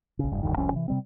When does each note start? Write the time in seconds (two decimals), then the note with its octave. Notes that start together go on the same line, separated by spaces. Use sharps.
0.19 A#1 C#3
0.32 F1 G2
0.43 E1 D2 G2 D#3
0.57 F1 C2 F3 C#4
0.72 C3 E3
0.88 C3 G3 C4